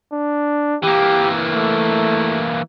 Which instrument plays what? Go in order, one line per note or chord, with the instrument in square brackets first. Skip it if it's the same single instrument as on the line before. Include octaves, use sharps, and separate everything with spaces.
[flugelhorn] D4
[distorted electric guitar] E3 A#3 [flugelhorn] G4
[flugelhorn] A3